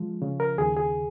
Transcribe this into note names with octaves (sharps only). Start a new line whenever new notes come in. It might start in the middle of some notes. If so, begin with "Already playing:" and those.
Already playing: F3 G#3
C#3
A#4
D#2 G#4
G#4